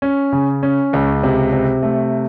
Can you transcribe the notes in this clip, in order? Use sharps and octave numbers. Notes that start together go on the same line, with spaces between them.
C#4
C#3
C#4
C#2
C3
C3
A3